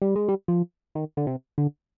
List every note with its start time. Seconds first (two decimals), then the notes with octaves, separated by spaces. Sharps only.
0.02 G3
0.16 G#3
0.28 G3
0.48 F3
0.95 D#3
1.17 D3
1.27 C3
1.58 D3